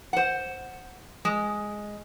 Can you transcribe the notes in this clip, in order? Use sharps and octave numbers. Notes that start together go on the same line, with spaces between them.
C5 F#5
G#3